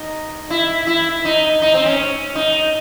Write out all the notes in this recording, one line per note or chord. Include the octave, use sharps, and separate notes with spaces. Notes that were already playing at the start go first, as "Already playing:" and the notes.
Already playing: D#4
E4
E4
D#4
D#4
C4
C#4
D#4